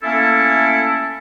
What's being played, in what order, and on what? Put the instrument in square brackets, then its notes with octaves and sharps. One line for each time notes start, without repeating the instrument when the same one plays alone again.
[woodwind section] A3 A#3 C#4 E4 A4